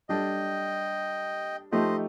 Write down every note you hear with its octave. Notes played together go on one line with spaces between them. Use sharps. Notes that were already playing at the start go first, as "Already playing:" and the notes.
G3 D4 A4 D#5 G5
F3 A3 D#4 G4 C5 D#5